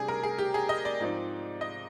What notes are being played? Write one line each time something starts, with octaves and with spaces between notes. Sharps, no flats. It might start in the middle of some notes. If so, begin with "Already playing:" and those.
Already playing: C3 G3 D4 G#4
A#4
G#4
G4
G#4
D#5
D5
G#2 F3 C4 D#4
D#5